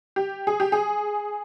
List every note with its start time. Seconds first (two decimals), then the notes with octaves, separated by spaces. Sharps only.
0.16 G4
0.47 G#4
0.60 G4
0.72 G#4